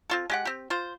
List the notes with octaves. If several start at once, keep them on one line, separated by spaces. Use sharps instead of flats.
C4 F4 A4
G#3 G4 F#5
C4 G4
F4 C5